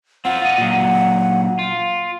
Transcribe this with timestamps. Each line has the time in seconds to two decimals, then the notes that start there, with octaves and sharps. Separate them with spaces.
0.25 C4 F4 F#5
0.42 F4 D#5
0.58 A#2 F#3
1.59 F4